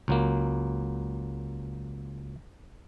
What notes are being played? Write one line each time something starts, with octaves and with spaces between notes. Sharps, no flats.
C#2 F#3 A#3